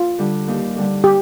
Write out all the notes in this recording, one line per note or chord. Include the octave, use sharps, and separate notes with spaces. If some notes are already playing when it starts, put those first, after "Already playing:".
Already playing: F4
D3 G3
D#2
D3 G3
G4